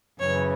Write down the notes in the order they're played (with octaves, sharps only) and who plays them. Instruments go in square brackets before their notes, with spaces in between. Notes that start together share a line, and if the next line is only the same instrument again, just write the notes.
[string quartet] F#2 C#3 E3 C#5